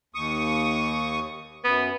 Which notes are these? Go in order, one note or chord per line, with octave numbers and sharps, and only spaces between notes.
D#2 C#6 D#6
F#2 B3